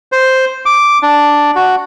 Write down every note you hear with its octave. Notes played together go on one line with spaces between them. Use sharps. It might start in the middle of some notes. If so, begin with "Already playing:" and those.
C5
D6
D4
F#4